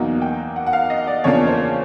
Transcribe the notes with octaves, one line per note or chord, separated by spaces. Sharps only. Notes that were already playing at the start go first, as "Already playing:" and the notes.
Already playing: E2 B2 F#3 A#3 D#4 F#5
G5
F#5
F#5
F5
D#5
D5
E2 C#3 F3 A#3 D4 C#5
C5